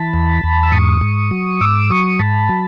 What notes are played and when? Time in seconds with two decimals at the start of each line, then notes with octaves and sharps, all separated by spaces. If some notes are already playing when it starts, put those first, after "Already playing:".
Already playing: E3 A5 B5
0.14 E2
0.43 E2
0.63 E6
0.72 G#2 C#6 D#6
1.01 G#2
1.31 F#3
1.61 G#2 D6 E6
1.90 F#3 C#6 D#6
2.19 G#2 A5 B5
2.49 F#3